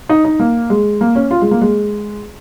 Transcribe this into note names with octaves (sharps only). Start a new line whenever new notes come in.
D#4
D#4
A#3
G#3
A#3
C#4
F4
G#3
A#3
G#3